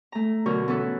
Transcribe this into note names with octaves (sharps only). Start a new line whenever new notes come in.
A3 A#5
B2 D3 F#3 F#4 A#4
E3 B3 C#4 F#4 A4 B4